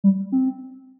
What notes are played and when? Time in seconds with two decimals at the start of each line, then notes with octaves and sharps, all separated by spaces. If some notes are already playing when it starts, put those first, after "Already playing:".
0.04 G3
0.32 C4